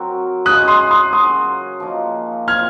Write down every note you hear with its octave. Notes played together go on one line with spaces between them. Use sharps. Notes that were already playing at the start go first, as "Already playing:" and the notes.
Already playing: F#3 C4 F#4 A#4
C#3 G#3 C#4 G#4 D#6 F#6
C6 D#6
C6 D#6
F#3 C#4 F#4 C6 D#6
F3 A#3 D#4
A#2 F3 C4 F6 G#6